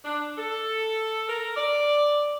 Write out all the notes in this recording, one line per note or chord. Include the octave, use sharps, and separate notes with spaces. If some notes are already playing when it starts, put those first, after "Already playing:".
D4
A4
A#4
D5